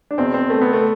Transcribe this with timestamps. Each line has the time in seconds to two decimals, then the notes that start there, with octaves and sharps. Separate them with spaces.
0.11 D4
0.18 E2 B2 C4
0.34 C4
0.50 A3
0.62 B3
0.73 A3